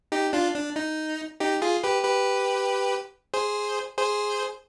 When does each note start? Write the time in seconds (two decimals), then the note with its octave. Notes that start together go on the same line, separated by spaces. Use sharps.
0.12 D#4 G4
0.33 D4 F4
0.54 D4
0.76 D#4
1.40 D#4 G4
1.62 F4 G#4
1.83 G4 B4
2.04 G4 B4
3.34 G#4 C5
3.98 G#4 C5